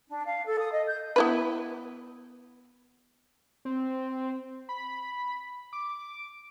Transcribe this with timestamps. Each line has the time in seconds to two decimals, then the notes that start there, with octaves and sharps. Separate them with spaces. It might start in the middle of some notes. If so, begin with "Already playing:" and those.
0.08 D4
0.25 F5
0.46 A4
0.60 D#6
0.72 D#5
0.87 G6
1.16 B3 E4 B4
3.65 C4
4.69 B5
5.73 D6